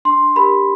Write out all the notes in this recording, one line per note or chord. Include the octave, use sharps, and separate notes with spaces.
D4 C6
G4 A#4 B5